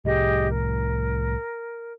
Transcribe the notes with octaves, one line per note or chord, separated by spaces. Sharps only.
C2 A2 G4 G#4 D#5
A#4